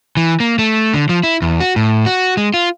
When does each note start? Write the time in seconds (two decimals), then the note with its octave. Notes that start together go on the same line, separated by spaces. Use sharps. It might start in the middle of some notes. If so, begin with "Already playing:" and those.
0.17 E3
0.40 A#3
0.59 A3
0.94 D3
1.09 F3
1.24 E4
1.42 E2
1.60 F#4
1.76 A2
2.06 F#4
2.37 G#3
2.54 F4